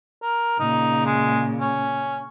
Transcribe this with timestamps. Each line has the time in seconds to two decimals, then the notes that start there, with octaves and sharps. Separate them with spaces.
0.23 A#4
0.60 A#2 C#3 D#4
1.06 G#3
1.60 C#4